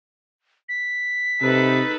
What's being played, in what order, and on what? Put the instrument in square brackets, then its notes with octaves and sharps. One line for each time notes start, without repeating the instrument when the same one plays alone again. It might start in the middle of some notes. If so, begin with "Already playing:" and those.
[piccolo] B6
[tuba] C3 [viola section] D#4 A4 B4